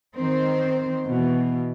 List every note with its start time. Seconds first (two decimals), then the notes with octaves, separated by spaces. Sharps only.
0.16 D#3 C4 C5
1.06 B2 E3